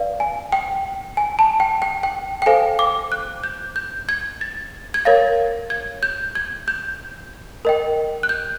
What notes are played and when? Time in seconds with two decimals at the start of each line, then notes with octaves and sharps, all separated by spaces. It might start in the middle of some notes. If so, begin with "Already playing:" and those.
Already playing: B4 D5 F5
0.20 G#5
0.52 G5
1.17 G#5
1.39 A5
1.60 G5
1.82 G5
2.03 G5
2.42 G5
2.46 A4 C5 F5 G#5
2.79 D6
3.12 F#6
3.44 G6
3.76 G6
4.09 G#6
4.41 A6
4.94 G#6
5.05 A#4 C#5 F5 A6
5.70 G#6
6.03 G6
6.35 G#6
6.68 G6
7.65 A#4 D#5 G5
8.23 F#6
8.29 G6